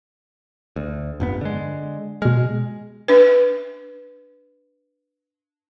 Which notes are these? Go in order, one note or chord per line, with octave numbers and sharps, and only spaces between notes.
D2
F1 G2 B3
D3 G#3
B2 G#3 F6
D4 B4